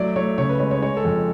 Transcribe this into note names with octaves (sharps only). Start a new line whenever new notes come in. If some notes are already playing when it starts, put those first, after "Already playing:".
Already playing: F#3 A3 D5
A3 C#5
C#3 C#5
B4
G#3 C#5
C#5
G#3 C#5
A4
F2